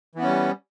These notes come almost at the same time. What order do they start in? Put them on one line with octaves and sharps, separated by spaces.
E3 B3 C#4 G3